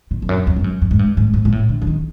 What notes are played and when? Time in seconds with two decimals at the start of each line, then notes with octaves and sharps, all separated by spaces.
0.11 A#2
0.22 F2
0.29 F#2
0.47 F2
0.56 G2
0.64 F#2
0.82 F#2
0.91 G#2
0.99 G2
1.17 G#2
1.33 G#2
1.45 A#2
1.52 A2
1.69 D3
1.82 D3
1.87 D#3